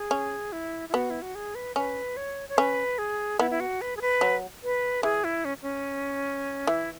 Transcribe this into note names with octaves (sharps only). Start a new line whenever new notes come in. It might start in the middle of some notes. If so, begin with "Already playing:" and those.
Already playing: G#4
C#4
E4
E4
B3 F#4
E4
F#4
G#4
B4
C#4 B4
C#5
C#5
C#4 B4
G#4
B3 E4
E4
F#4
B4
G#4
B4
F#3
B4
E3 G#4
E4
C#4
C#4
E3 E4